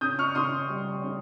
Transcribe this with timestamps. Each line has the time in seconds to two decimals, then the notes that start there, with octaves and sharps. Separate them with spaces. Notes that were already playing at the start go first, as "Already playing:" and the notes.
0.01 C#3 D#6 G6
0.19 C#6 F6
0.35 C#3 C6 D#6
0.70 G3
1.04 C#3